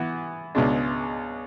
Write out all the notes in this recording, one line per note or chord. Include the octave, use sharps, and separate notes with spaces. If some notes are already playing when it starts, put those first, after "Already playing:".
Already playing: E3 B3 F#4
C#2 B2 G#3 D4